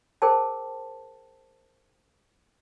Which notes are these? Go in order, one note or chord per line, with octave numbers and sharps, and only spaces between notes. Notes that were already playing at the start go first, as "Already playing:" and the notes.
G#4 A#4 C5 G5 A5